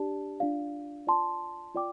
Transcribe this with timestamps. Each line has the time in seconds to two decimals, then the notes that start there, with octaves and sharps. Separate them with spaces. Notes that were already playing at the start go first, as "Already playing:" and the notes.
Already playing: D4 G4 D5 A5
0.40 D4 F4 D5 F5
1.07 F4 D5 A5 C6
1.74 F4 D5 G5 D6